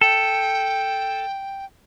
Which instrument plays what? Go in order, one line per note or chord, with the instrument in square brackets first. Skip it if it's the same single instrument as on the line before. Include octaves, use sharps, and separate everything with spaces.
[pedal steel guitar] A4 [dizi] G5